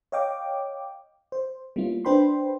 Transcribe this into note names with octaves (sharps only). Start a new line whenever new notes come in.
C#5 D#5 F5 G5 D6
C5
G3 A#3 B3 C#4 E4 F4
D4 B4 C5 G5 B5 C6